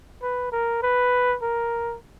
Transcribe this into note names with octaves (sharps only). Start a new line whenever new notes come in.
B4
A#4
B4
A#4